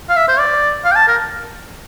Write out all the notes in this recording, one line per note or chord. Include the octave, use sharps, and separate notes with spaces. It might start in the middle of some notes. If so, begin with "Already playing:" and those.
F5
E5
C5
D5
F5
G5
A5
A#4